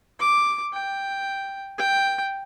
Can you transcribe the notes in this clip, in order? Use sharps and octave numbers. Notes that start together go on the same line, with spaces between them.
D6
G5
G5